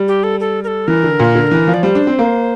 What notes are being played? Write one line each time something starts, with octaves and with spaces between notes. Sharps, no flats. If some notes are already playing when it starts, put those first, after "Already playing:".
Already playing: G3
G4
A4
A4
A#4
A4
E3 A#4
D3
A#2
D3
E3
F3
D5
G3 C5
D4
C4
A#3